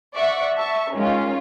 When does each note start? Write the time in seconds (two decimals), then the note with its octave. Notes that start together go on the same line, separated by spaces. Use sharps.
0.16 D5 E5 F#5 C#6
0.56 E5 A5 C#6
0.94 D#3 G#3 C#4 F4